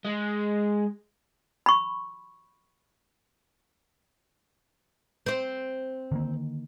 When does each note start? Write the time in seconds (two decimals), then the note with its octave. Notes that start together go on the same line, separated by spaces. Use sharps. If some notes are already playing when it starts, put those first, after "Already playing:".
0.05 G#3
1.66 B5 C#6
5.26 C4 C5
6.12 D3 D#3 A#3